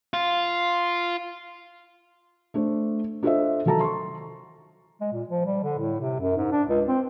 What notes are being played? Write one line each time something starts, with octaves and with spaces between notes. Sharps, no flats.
F4
A3 D4 C5
D4 F4 A4 C5 D#5 E5
D#3 F#3 A4 A5 A#5
C6 C#6
G#3
A#2
F3
G3
D3
A2
C3
F#2
G#2
D4
C#2
C4